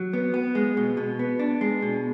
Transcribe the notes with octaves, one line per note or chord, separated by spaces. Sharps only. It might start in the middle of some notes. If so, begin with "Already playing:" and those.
Already playing: F#3
B3
B3
G#3
B2
B2
B3
D4
G#3
B2